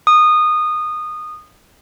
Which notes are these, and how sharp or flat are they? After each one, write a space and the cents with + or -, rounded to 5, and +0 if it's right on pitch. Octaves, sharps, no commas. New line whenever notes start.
D#6 -20